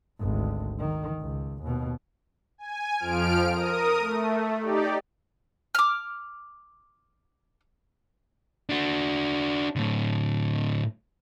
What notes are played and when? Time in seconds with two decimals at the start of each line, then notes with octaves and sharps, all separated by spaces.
0.19 G#1 D2
0.79 D#3
1.21 C#2
1.63 D#2 B2
2.58 G#5
2.98 F2 F3 F6 D7
3.52 A#4 D#6
4.00 A3
4.61 D#4 G4 D5
5.75 D6 F6
8.69 D4 F#4
9.76 A2 D3